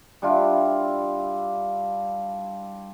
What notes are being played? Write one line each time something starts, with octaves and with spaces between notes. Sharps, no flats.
G3 D4 E4 F4